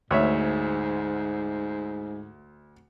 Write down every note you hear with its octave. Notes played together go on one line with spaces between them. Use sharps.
D2 G#2 C#5 E5